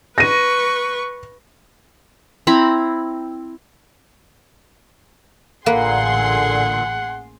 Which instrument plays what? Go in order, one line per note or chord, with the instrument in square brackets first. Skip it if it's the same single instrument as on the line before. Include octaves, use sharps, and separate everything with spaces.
[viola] B4 C#6 [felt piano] A#6 D#7
[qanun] C4 E4 A#5 B5
[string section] A1 G#4 C6 [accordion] A#2 D3 [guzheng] A#3 B4 [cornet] F#5